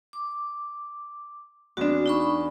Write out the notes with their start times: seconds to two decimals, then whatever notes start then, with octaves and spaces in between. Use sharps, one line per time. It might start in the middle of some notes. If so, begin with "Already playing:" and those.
0.13 D6
1.77 E2 C4 D4 F#4
2.06 D#4 B5 C#6